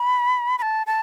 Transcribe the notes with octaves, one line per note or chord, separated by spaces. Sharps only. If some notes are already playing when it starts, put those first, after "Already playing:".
Already playing: B5
B5
A5
A5